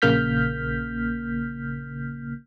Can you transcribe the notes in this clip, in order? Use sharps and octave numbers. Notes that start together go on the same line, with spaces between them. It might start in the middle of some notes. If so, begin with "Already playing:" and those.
A#1 C#3 A#3 F6 G6 B6